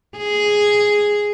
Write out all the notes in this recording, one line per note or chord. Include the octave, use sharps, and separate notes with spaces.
G#4